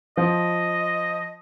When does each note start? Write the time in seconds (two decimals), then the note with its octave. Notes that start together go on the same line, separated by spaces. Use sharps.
0.17 F3 D#5